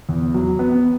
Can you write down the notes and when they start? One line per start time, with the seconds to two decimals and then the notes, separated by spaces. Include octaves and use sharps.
0.09 E2
0.34 F#3
0.59 B3